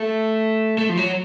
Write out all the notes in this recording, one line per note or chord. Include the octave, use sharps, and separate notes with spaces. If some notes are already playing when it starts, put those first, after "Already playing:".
Already playing: A3
A3
F3
F#3